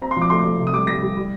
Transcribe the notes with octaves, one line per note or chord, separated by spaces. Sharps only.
C4 A#5
C6
F3
D6
A3 C6
D6
A3
C3
D#6
G3 D6
G3 A#6
G3
G3